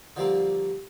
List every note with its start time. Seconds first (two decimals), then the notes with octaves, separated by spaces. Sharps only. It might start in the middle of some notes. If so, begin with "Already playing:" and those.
0.16 D3 F3 G3 A#3 C4